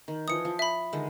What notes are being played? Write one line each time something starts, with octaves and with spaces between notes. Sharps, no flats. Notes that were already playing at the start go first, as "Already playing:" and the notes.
D#3
E3 F3 D#6 C#7
F3
E5 B5
D3 D#3 G#3